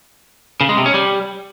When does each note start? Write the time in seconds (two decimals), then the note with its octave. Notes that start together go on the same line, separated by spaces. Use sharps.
0.61 C#3
0.69 G#3
0.77 C3
0.86 C#4
0.94 G3